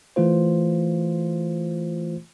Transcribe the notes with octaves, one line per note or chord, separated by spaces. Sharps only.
E3 A3 F4 C5